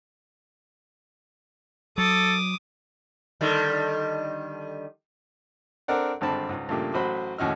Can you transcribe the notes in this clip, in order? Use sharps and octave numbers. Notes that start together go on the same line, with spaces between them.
F#3 A4 D6 D#6
D3 D#3 G3
C4 D4 A4 A#4 D5 F#5
G#1 G2 D3 C4 A5 B5
C#2 G#2
G2 A#2 C#3 A3 A#3 G4
A1 F#3 F#4 C5 B5
D#2 A2 C#4 F#4 D#5 F6